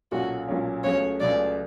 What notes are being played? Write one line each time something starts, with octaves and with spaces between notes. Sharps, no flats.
B1 A#2 F#3 A#3 C#4 F#4
B1 A#2 F#3 A#3 C#4
C#2 C#3 F#3 A3 C#5
C#2 C#3 F#3 A3 D5